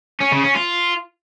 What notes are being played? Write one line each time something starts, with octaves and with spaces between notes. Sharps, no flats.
C#4
C#3
C#4
F4